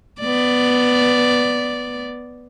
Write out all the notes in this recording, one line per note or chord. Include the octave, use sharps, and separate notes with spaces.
B3 D5